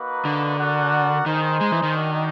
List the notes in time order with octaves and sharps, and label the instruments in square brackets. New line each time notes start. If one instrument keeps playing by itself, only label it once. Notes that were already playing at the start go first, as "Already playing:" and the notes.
Already playing: [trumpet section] A#3 D#4 F#4 B4
[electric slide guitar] D3
[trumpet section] F#4 A#4 D5 F#5
[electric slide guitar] D#3 [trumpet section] D#4 G#4 C5
[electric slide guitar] G#3
E3
D#3
[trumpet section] D4 F#4 A#4 D#5 G5